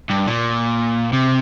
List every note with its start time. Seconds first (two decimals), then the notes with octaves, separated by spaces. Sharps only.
0.10 G2
0.27 A#2
1.13 C3